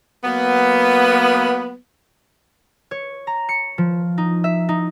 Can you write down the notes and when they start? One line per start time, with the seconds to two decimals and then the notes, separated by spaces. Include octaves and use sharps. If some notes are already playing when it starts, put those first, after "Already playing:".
0.24 F#3 A#3 B3
2.91 C#5
3.27 A#5
3.49 C#7
3.78 F3
4.18 D#4
4.44 E5
4.69 D#4